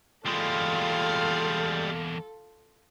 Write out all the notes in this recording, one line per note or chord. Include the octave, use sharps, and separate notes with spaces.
E2 G3 G#3 A#3 F4 A4 F5